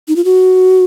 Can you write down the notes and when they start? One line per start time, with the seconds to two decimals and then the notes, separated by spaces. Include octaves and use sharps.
0.08 D#4
0.16 F4
0.25 F#4